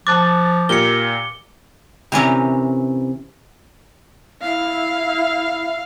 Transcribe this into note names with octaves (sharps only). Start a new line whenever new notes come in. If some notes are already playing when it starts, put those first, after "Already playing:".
F3 A5 D6 F#6 A6
A#2 G4 A#4 C#7 G7
C3 E3 C#4 A#4
E4 F5